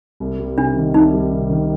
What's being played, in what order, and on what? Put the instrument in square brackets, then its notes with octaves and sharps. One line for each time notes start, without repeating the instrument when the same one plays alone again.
[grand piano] C2
G3
[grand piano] C3 [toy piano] D4
[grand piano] D#3
[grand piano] C2 [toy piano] D#4
[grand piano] G3
C3
D#3